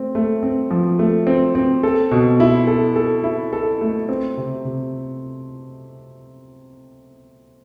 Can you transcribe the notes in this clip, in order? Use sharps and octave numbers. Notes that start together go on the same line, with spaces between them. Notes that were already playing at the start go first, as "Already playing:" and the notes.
Already playing: A3 C4
A3
C4
F3
A3
C4
C4
A4
B2
E4
A4
A4
E4
A4
A3
C4
C3
C3